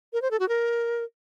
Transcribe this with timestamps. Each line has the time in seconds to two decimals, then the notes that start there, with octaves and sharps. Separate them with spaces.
0.13 A#4
0.22 C5
0.31 A4
0.40 F#4
0.48 A#4